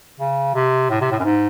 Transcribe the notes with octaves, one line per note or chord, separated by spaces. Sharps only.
C#3
C3
A2
C3
A2
F#2
G#2